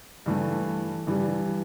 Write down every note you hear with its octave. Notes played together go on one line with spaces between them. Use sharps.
G2 E3 A3
G2 E3 G3